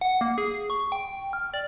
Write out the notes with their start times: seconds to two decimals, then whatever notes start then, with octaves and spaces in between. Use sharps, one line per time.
0.01 F#5
0.21 A#3
0.38 G#4
0.70 C#6
0.92 G5
1.33 F6
1.54 D5